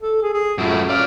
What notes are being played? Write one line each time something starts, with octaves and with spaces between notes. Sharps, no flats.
A4
G#4
G#4
F#2 A2 F4
C#4 D5 F5